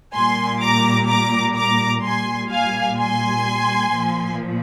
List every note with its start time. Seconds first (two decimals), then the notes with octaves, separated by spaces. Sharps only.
0.14 A#2 G3 G#5 C6
0.62 A#5 D6
1.09 A#5 D6
1.56 A#5 D6
2.04 A#2 G3 G#5 C6
2.52 F5 G#5
2.99 G#5 C6
3.93 A#2 F3